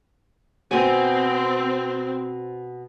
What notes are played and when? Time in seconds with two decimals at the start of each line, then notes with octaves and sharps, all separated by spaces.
0.71 B2 C4 G#5